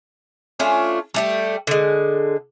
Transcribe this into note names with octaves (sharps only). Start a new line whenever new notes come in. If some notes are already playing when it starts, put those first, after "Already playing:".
A3 C#4 D4 F4
G3 A3 G4
D3 G#3